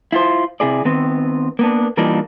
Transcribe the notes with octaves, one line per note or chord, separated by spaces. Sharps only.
E4 F4 C5
C3 E4 G#4 D5
D#3 B3 C4
A#3 B3 D4
E3 G3 A#3 D4 D#4 F4